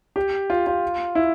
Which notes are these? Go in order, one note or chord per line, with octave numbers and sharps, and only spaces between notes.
G4
F4
F4
E4